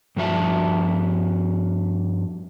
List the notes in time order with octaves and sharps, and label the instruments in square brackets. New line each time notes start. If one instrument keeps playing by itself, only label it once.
[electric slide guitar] G2 F3 F#4 E5 A5